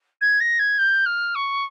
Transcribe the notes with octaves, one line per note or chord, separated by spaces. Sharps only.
G#6
A#6
G#6
G6
F6
C#6